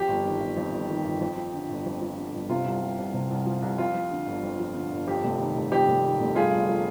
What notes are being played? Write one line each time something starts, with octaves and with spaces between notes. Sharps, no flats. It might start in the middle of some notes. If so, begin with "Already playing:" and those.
Already playing: F2 G4
G1
D#3
G1
F2
G1
D#3
G1
F2
F3
D3
G1
F2
F3
D3
G1
C3 F4
C2
F3
C2
C3
C2
F3
C2
F2 F4
F3
D3
G1
F2
F3
D3
G1
F2 G4
F1
D#3
F1
F2 G4
F1
D#3
F1
G2 F4 G#4
G1
F3